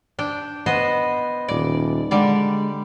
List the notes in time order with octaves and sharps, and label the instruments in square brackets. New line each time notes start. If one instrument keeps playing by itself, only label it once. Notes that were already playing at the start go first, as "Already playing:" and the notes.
[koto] D4 G5
B3 C5 D#5
[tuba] D#1 [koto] D5
[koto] D3 G3 D5 [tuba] G#3